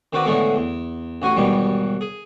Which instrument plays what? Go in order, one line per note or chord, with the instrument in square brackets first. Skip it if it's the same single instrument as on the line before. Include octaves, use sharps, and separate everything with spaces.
[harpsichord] D#3 C4 F#4 B4 D5
A2 D3 E3 G#3 A3 B3
E2
A1 F#4 G#5 C#6
D#2 G#2 B2 E3 G3
G#4